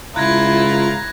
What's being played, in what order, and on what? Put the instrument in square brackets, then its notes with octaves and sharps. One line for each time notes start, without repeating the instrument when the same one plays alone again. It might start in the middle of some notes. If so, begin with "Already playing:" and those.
[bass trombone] C#2 [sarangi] E4 [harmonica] F4 A#5 [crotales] F#6 G#6 A#6